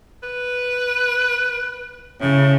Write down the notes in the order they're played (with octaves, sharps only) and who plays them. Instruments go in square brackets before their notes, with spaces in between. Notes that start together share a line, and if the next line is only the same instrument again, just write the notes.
[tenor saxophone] B4
[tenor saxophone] A2 [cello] C#3